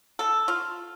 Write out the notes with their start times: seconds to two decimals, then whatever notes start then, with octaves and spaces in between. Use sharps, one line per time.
0.19 A4
0.48 F4